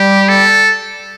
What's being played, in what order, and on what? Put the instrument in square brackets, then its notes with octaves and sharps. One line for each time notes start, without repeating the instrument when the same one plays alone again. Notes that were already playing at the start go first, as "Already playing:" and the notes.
Already playing: [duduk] G3 [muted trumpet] G4
[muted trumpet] A4